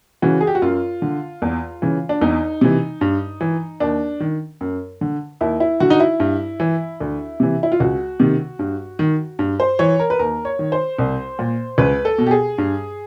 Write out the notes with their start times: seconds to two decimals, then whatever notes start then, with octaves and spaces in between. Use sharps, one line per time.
0.22 C#3 E3 F#4
0.41 G#4
0.47 G4
0.55 F#4
0.62 F#2 F4
1.02 D3
1.42 E2
1.82 C#3 E3
2.09 D4
2.21 E2 D#4
2.61 C3 E3
3.01 G2
3.41 E3
3.80 D#2 D4
4.20 D#3
4.61 F#2
5.01 D3
5.41 D#2 E4
5.60 E4
5.80 D3 F#4
5.90 D#4
6.00 E4
6.20 G2
6.60 E3
7.00 D2
7.40 C3 E3
7.63 E4
7.72 F4
7.80 C#2 F#4
8.20 C3 D#3
8.59 G2
8.99 D#3
9.39 G2
9.60 C5
9.79 E3 C#5
9.99 A#4
10.10 B4
10.19 D#2 A#4
10.45 C#5
10.59 D#3
10.72 C5
10.99 C2
11.39 A#2
11.78 C#2 B4
12.05 A4
12.18 B2
12.27 G4
12.31 G#4
12.58 G2